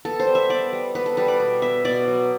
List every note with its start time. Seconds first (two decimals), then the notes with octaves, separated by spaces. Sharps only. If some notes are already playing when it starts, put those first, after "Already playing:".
0.05 B3 A4
0.20 C5
0.27 G3
0.35 E5
0.49 B3 D5
0.73 G3
0.95 B3 B4
1.06 A4
1.17 G3 B4
1.28 D5
1.40 B2
1.62 B3 E5
1.85 B2 D5
2.07 F#3